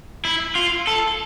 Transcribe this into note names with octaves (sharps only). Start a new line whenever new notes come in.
E4
F4
A4